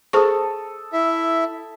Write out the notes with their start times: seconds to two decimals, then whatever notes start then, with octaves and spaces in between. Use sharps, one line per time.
0.13 G#4 A4 C5 C#6 D#6
0.93 E4 E5